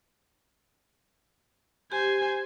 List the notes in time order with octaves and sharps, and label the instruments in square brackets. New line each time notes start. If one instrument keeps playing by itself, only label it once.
[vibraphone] G4 [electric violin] C5 G#5